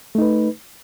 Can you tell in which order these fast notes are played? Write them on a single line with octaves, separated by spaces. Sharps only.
A3 D#4 B4